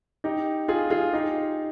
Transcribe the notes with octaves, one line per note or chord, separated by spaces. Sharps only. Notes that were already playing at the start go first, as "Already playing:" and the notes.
D#4 G4
F4 G#4
F4 G#4
D#4 G4